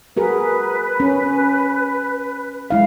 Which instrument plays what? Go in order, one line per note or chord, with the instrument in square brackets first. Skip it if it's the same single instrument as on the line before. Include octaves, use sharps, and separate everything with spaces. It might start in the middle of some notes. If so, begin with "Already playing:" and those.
[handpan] F#4 G#4 A#4 [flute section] B4
[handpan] C#4
G#3 E4 F5